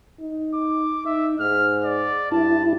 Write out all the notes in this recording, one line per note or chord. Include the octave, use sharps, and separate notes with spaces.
D#4
D6
D#4 E5
G#2 F6
D5
G2 E4 A5